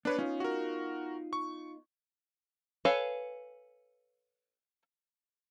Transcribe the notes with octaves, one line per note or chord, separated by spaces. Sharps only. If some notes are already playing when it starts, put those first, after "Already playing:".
B3 D4 B4 C#5
B3 C#4 D#4 F4
F#4 A#4
C#6
A4 B4 C#5 F5 G#5